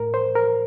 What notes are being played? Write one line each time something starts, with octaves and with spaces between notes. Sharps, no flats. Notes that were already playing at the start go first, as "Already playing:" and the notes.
Already playing: A2 A#4
C5
A#4